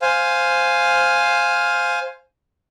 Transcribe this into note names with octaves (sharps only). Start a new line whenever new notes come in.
C5 F5 G#5